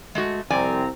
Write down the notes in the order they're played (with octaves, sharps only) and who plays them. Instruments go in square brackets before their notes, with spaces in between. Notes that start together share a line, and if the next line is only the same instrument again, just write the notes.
[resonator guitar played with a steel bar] G#3 A3 F#4
[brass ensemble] C2 C4 A#5 [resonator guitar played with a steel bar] F2 D5 G#5